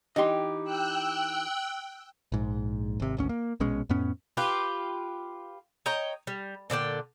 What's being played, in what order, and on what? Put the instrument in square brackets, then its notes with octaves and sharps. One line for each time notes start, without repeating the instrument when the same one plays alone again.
[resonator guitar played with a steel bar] E3 D#4 G4 [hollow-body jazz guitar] D#5 C6
[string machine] G5 E6 F#6
[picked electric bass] A#1 G#2
G#1 C3
G#1 D2 C#4
A#3
A#1 B2 G#3 C#4
F2 A2 B3 C#4
[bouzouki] F4 G4 B4
C#5 D#5 G5 A#5
G3
A#2 D3 D5 G5